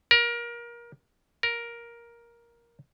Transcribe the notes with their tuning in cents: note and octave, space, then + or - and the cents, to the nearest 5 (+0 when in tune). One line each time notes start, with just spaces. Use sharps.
A#4 +25
A#4 +10